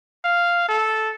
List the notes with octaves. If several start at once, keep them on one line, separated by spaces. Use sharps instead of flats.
F5
A4